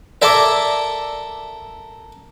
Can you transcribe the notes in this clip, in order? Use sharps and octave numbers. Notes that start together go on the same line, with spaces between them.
A4 A#4 D5 E5 D6